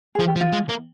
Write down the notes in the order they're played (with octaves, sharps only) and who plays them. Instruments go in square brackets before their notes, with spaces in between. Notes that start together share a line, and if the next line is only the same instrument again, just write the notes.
[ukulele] G#4
[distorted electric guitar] F3
[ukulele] G4
[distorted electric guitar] F3
[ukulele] F4
[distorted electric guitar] G#3
A#3